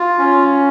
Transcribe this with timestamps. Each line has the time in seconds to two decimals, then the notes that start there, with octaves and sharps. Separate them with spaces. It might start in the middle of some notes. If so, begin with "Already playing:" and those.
Already playing: F4
0.18 C#4